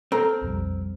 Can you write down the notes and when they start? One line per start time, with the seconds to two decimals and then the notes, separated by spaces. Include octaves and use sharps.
0.12 C4 A4 A#5 F6
0.42 B1 F2 G3